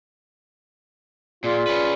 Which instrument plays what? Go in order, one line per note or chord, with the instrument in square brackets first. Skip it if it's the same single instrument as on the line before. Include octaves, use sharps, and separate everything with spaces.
[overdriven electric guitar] A#2 [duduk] F4 [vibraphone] G#4 D5
[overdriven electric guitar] C#4 B4